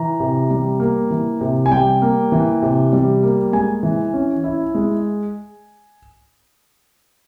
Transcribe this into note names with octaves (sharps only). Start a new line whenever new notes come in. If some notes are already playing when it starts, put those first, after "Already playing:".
Already playing: E3 A#5
C3
G3
A#3
E3
C3
G#5
G3 G5
A#3
E3
C3
G3
A#3
G#3 G#5
E3
C#4
E4
G#3